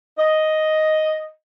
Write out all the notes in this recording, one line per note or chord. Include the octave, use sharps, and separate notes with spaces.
D#5